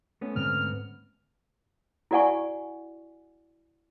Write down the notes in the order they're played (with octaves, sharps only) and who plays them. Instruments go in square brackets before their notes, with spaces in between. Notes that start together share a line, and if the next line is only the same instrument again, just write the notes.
[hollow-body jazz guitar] A3 B3 C#4
[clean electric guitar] D2 G#2 C4 [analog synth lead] F6
[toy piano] E4 F#4 D5 F#5 G#5 C#6